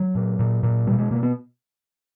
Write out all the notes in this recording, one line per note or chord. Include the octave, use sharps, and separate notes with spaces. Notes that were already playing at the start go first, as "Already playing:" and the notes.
Already playing: F#3
A#2
A#2
A#2
B2 G3
G#3
B2 A#3
B3